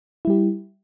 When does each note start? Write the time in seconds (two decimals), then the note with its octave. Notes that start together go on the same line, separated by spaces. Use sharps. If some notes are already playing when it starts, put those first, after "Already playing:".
0.25 E4
0.27 G3
0.30 G4